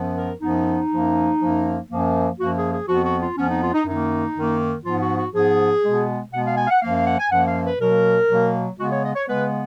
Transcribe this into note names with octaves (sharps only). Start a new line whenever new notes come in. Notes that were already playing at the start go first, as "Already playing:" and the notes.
Already playing: F#2 F3 B3
A#4
F#2 F3 B3 D#4
F#2 F3 A#3
F#2 F3 A#3
F#2 F3 A#3
F#2 F3 A#3 F#4
G#4
G#4
F2 F3 B3 F#4
F#4
F4
F2 F3 B3 C#4
D#4
F4
D#4
F#2 D#3 A#3 D#4
F#2 D#3 A#3
G#2 F3 B3 F4
F#4
F#4
G#2 F3 B3 G#4
B2 G#3 B3
B2 G#3 B3 F#5
F5
G#5
F5
F#5
F#2 F3 A#3 F5
F5
F#5
G#5
F#2 F3 A#3 F#5
F5
B4
B2 F#3 A#3 A#4
B2 F#3 A#3
C#3 G#3 B3 F#4
C#5
D#5
C#5
C#3 G#3 B3 B4